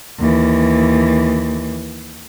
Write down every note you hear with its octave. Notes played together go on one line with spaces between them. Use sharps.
D#2 E3